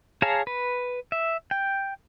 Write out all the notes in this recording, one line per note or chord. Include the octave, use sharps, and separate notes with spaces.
G#4 C#5 F5 A5 A#5
B4
E5
G5